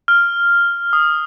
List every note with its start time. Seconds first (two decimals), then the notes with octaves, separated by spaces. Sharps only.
0.08 F6
0.93 D#6